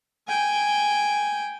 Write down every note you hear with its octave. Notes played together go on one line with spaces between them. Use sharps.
G5 G#5